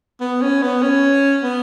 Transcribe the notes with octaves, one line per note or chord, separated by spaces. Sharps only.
B3
C#4
B3
C#4
B3